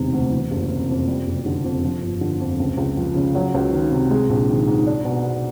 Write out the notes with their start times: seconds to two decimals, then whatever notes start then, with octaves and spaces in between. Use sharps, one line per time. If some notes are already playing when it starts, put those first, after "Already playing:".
Already playing: E1 C3 D#3
0.13 D2
0.32 E3
0.51 F#1
0.70 C3
0.89 F2
1.07 G3
1.27 F#1
1.46 D3
1.64 F2
1.84 F3
2.02 G1
2.21 D3
2.40 F2
2.60 C#2
2.77 C#2
2.97 F3
3.15 C#3
3.35 F#3
3.54 C#2
3.72 D#3
3.91 C3
4.11 G#3
4.29 A#1
4.49 D#3
4.68 G#2
4.87 D4
5.05 B2
5.25 B3